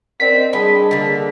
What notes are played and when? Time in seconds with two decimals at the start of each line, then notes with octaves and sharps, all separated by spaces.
0.20 C4 A#4 D5 D#5 B6
0.53 G3 G#3 D4 D#5 B5
0.91 D3 A#3